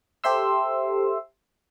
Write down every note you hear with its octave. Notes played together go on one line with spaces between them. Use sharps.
G4 A4 C5 E5 C6 E6